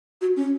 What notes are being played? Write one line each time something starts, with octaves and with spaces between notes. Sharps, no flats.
F#4
C#4